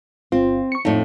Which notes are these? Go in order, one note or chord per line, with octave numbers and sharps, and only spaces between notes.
G1 C4 F4
C#6 C#7
F2 A2 D#4